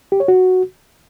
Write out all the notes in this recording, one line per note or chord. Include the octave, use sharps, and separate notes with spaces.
G4
C#5
F#4